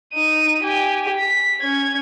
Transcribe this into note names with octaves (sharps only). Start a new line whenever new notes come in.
D#4 D#7
G4 G#5
B6
C#4 G#6